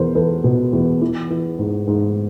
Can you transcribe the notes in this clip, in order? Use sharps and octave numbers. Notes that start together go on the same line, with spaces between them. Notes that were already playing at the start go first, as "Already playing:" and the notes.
Already playing: E2 B2 A#4 C5
E2 A4 B4
B2
E2
E3
E3
G#2
G#2